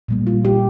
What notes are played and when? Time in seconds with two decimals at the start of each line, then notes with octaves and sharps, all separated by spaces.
0.08 A#2 G3 A#3
0.27 F4
0.45 G4